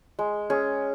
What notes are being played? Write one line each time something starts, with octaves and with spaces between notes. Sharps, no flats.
G#3
C#4 G#4